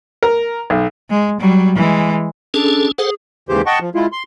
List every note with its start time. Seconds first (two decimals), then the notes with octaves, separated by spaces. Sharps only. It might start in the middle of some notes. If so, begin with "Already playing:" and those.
0.23 A#4
0.70 B1
1.10 G#3
1.40 F#3 G3
1.76 E3 G#3
2.54 C#4 D4 G#4 A4
2.98 G#4 A4 C5 F#5
3.49 D#2 G#2 C#3 E3 G4 C5
3.66 D#5 F#5 G5 A5 C#6
3.81 F3
3.95 G#3 E4 F4
4.12 C6